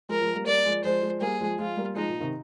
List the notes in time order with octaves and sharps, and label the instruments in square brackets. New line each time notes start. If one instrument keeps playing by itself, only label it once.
[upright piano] F3 G#3 [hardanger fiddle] A#4
[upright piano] F3 G#3
G3 A#3
[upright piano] G3 A#3 [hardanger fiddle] D5
[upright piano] F3 G#3
[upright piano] F3 G#3 [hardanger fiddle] C5
[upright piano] F3 G#3
[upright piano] G3 A#3 [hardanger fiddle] G#4
[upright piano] F3 G#3
[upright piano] F3 G#3 [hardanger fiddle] F4
[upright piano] G3 A#3
[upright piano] F3 G#3 [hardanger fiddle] D#4
[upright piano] A#2
C3 D#3